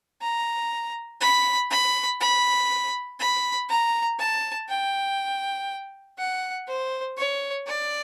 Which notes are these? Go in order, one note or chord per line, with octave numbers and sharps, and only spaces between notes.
A#5
B5
B5
B5
B5
A#5
A5
G5
F#5
C5
C#5
D5